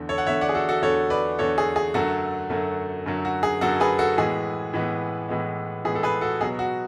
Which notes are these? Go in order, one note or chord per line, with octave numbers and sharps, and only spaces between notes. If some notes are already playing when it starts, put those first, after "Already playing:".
Already playing: E2 D3 A3
A4 C#5
F#5
E2 D3 A3 C#5 E5
D5 F#5
G#4
F#4 A4
F#4 A4
E2 D3 A3 A4 C#5
B4 D5
E2 D3 A3 A4 C#5
G#4
G#4
F#2 D3 F#3 A3 F#4 A4
F#2 D3 F#3 A3
F#2 D3 F#3 A3
F#4
G#4
F#2 D3 F#3 A3 F#4 A4
G#4 B4
F#4 A4
A2 E3 G#3 B3 G#4
A2 E3 G#3 B3
A2 E3 G#3 B3
A2 E3 G#3 B3 G#4
A4
G#4 B4
F#4 A4
B2 F#3 B3 G#4
F#4